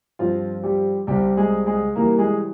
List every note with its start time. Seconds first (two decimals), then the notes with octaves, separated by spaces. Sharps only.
0.19 G2 F3 C4 F4
0.63 G3 G4
1.07 C2 C3 G3 C4 G4
1.37 G#3 G#4
1.66 G#3 G#4
1.95 C3 E3 G3 A#3 A#4
2.18 G#3 G#4